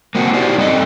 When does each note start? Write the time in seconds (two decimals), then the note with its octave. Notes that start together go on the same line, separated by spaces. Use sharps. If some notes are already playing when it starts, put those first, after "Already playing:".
0.15 A#3 C4 F#4
0.34 D#4 E4 G4 C5 D5
0.57 G2 C4 A4 D#5